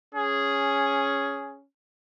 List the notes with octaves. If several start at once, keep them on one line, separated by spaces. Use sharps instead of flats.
C#4 G#4